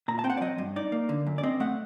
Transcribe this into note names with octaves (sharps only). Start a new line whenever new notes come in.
A#2 A#5
A5
C4 G5
F#5
D5
F#3 D#5
G2
D#4 D5
A#3
D3
F#2
D5
C4 D#5
A3 F#5